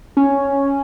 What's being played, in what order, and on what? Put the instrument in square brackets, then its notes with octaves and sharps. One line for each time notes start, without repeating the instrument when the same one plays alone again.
[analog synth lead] C#4